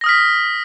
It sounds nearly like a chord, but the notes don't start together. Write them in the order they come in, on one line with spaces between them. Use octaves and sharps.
A#6 D#6 F6 B6